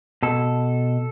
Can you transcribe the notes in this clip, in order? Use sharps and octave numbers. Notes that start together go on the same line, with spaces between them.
B2 A4